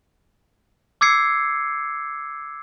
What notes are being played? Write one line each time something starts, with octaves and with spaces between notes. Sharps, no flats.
D6 E6 G#6 C7 C#7